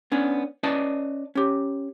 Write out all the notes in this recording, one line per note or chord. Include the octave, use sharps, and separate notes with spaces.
B3 C#4 D4
C#4 B4 D5 D#5 A5
C#4 G4